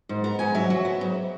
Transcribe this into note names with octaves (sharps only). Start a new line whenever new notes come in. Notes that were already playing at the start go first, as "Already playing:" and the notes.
G#2
B3 A#5
G#2 G#5
F#3 E5
F#3
B3
G#2